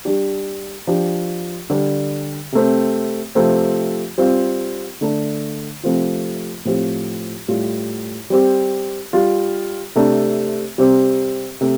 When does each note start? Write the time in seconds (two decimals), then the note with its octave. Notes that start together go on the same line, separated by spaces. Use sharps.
0.05 G3 D4 G4
0.87 F3 D4 G4
1.70 D3 G3 D4 G4
2.52 C3 A3 C4
3.35 C3 F3 A3 C4
4.18 G3 C4 F4
5.01 D3 A3 D4
5.83 C3 F3 A3 C4 F4
6.65 A2 F3 C4 G4
7.48 A2 G3 F4
8.30 G3 C4 G4
9.13 G3 F4
9.95 C3 A3 D4
10.78 C3 G3 C4 G4
11.61 C3 A3